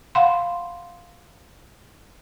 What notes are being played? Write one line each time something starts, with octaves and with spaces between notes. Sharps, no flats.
F5 F#5 B5 C6